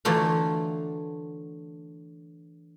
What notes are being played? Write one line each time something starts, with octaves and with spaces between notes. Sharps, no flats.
D3 E3 F#3 A3 D4 F4